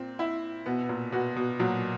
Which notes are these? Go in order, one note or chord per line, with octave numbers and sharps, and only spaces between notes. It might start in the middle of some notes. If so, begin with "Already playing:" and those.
Already playing: A#2 C4
E4
B2 B3
A#2
B2 F#4
B2
A#2 F#3